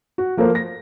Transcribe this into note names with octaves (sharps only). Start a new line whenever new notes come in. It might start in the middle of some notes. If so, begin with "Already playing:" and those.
F#4
F3 A#3 A4 A#4 C5
A#6